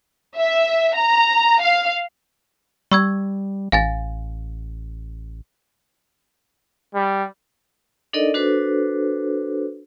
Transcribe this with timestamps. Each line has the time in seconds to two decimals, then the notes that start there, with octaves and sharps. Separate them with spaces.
0.37 E5
0.95 A#5
1.61 F5
2.91 G3 C#6 E6 G#6
3.72 A1 F5 G#5 A6
6.95 G3
8.13 D4 D#4 A4 A#4 D5 D#5
8.34 D4 F#4 A4 B4 C5